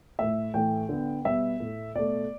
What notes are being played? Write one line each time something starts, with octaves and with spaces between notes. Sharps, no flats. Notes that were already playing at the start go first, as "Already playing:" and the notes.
A2 A3 E5
A2 E3 A3 G5
D3 B3
B2 G3 B3 E5
A2 A3
B2 A3 D5